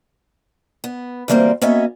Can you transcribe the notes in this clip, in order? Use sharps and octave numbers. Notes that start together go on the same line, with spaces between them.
B3
D2 E3 G3 A#3 C4 C5
A#3 B3 C#4 F#4 D#5 E5